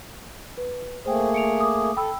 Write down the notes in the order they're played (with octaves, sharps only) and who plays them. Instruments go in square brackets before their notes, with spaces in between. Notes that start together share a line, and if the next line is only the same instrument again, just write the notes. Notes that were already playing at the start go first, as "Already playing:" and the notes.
[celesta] B4
[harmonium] A3 A#3 G#4 [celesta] C5 G5
[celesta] C#7 D7 F7
D6 D#6
[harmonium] A4 [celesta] G5 B5 E6